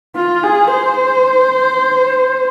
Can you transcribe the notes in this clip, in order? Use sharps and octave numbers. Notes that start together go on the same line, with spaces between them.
F4
G#4
C5